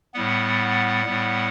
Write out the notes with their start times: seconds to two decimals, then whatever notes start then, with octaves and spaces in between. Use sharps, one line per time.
0.14 A2 G3 B3 F#5
1.05 A2 G3 B3